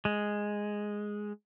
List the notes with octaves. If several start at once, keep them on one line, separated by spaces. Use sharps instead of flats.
G#3